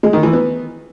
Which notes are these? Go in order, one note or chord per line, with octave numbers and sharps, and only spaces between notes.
G#3
D#3
E3
B3